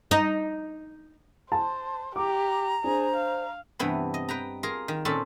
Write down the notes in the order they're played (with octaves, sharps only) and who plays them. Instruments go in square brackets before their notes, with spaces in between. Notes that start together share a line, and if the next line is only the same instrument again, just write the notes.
[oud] D#4
[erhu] C5 [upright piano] A5
[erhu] G4 [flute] A#5 [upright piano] D6
[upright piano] D4 [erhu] G#4 [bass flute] C5
[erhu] F5
[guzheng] G2 C3 E3 B3 B5
D#5
B4 G5 A#5
F4 G#4 A#4 A#5
D#3
A#2 C4 C#4 A4 A5 B5